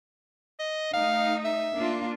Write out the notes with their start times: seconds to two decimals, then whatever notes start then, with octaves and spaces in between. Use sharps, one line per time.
0.60 D#5
0.94 A3 D#4 F5
1.45 E5
1.76 A#3 D4 F4